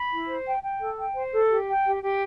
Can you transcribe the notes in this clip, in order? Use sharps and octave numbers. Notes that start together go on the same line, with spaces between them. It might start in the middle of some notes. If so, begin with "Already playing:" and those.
Already playing: B5
E4
C5
G5
G5
A4
G5
C5
A4
G4
G5
G4
G4